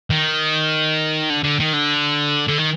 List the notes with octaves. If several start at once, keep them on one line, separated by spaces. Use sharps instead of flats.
D#3
D3
D3
D#3
D3
D3
D#3